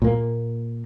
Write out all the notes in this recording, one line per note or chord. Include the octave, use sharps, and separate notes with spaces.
A#2 A#3